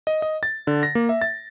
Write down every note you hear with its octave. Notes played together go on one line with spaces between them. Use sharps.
D#5
D#5
A6
D3
A#6
A#3
E5
A6